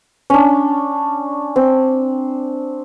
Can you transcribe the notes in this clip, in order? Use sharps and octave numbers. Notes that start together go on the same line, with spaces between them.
C#4 D4
C4